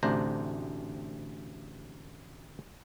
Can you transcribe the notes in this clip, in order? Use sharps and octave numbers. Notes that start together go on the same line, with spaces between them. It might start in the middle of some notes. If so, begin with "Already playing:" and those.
A1 D2 C3 D4 C5 A#5